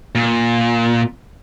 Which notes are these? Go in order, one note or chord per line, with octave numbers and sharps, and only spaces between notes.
A#2